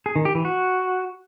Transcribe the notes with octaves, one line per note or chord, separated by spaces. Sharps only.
G#4
D#3
G4
E3
F#4